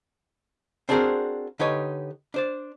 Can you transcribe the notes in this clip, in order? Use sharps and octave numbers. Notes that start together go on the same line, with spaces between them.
C4 D4 F#4 G#4 A#4 C5
D3 D#4 G4 B4 C#5
D4 C5 D5